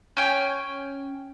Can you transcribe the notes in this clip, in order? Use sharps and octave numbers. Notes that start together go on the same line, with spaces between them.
C#4 G5 G#5